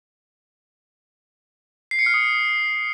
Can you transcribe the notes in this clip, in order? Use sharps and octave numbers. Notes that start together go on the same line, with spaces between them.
C7
C#7
F6
D#6